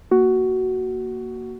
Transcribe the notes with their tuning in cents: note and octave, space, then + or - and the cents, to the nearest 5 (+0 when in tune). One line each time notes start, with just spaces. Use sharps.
A#3 +0 F#4 +10